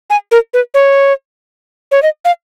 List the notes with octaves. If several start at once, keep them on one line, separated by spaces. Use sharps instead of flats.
G#5
A#4
B4
C#5
C#5
D#5
F5